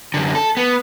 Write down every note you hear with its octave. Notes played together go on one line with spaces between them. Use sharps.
F#2 D3
A4
B3